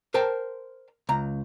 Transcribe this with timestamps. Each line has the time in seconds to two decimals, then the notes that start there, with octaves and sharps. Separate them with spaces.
0.14 A#4 C5 G5 A5
1.09 C#2 A#5